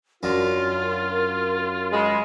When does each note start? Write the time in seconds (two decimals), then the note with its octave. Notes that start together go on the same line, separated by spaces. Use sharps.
0.23 F#2 D3 F4 A#4
1.92 G#3 B5